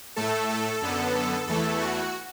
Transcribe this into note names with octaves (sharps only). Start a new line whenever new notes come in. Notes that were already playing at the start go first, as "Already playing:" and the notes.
A2 A3 A4
A4
F#2 D3 B3
E2 E3 A3 A4
F#4